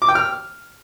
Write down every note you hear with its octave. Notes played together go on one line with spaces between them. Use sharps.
D6
G5
F6